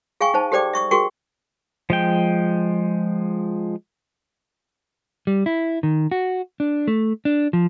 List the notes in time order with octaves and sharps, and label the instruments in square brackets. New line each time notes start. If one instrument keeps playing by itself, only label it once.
[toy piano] G#4 F5 G5 G#5 C#6
D#4 C5 A5
G4 A4 C5 D5 G5 D6
E5 C#6 D#6
F#4 G#4 A#4 G5 C#6
[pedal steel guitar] F3 G#3 G5
[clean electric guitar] G3
E4
D#3
F#4
D4
A3
D4
F3